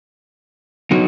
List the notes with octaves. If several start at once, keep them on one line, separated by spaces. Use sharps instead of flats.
D3 F#3 B3 D#4 F#4